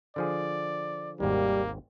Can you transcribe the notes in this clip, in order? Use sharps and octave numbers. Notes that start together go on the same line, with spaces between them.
D3 F3 G#4 D5
G#1 D#2 G3 A#3